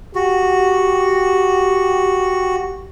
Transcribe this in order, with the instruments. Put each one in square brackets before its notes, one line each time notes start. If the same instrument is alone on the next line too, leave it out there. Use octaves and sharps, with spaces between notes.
[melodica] F#4 [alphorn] G4